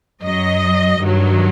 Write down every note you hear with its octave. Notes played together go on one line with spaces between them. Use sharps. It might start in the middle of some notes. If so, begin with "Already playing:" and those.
F#2 F#3 D#5
G2 D#3 F#3